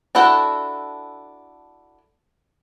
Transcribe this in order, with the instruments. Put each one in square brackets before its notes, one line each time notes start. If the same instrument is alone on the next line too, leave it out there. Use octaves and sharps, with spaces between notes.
[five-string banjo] D4 E4 F#4 A4 F#5